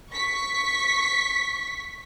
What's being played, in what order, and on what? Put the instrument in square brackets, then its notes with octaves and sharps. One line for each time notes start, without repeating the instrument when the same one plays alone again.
[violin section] C#6 B6